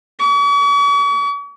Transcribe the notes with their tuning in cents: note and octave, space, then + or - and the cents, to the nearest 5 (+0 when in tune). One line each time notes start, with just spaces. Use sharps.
C#6 +45